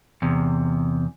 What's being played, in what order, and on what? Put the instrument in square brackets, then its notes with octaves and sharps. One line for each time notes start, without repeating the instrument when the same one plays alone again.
[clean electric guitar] E2 C3